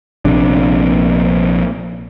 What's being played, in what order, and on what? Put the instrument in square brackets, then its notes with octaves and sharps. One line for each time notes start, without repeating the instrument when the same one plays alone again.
[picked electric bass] A#1 C3 D4